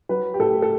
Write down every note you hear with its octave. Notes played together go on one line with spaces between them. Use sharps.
F#3 B4
G4
A2 A4
A4